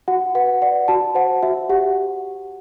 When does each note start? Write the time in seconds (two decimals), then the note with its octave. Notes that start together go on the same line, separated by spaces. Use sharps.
0.08 F#4 F#5
0.35 B4 F#5
0.62 D5 F#5
0.88 F#4 A5
1.15 C5 F#5
1.43 F#4 E5
1.69 G4 F#5